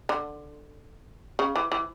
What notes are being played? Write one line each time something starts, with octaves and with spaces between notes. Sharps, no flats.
D3
C#3
E3
E3